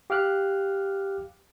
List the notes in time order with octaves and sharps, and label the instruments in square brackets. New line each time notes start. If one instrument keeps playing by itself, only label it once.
[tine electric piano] G4 F5 D6 F6 F#6